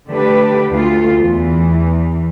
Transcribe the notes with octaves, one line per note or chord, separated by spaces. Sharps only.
D3 A3 D4 G4 B4
D2 A3 F4
E2 E3